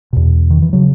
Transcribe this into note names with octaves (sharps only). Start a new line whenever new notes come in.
E2 B2
D#3
E3
C#3 F#3